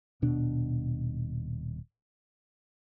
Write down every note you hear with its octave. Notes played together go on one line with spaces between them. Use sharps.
D#1 B2 D4